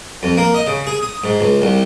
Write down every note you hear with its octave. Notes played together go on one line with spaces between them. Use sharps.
F2
A#3
D#5
C#3
G#4
D#6
G#2
C#2
C2